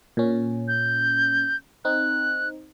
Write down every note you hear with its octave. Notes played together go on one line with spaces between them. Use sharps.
A#2 C#4
G6
C4 D#4 F#6